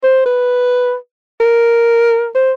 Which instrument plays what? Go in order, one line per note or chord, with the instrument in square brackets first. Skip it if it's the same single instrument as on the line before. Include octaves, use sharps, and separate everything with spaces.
[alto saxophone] C5
B4
A#4
C5